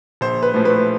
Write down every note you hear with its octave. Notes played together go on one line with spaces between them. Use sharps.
A#1 C5
B4
A2 F3 A3
B4